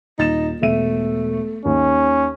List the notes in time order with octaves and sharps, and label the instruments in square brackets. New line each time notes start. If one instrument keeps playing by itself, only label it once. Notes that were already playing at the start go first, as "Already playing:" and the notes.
[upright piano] D#1 A6 E7 [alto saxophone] D#4
[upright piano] E1 E5 D#7 [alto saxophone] A3
[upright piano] D#2 [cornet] C#4